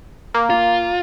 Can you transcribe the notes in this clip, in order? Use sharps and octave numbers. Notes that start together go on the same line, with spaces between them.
A#3
F4